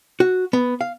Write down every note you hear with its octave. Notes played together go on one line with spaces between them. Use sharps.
F#4
B3
F5